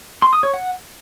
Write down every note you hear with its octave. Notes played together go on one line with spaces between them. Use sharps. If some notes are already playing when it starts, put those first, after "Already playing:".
C6
D#6
C#5
F#5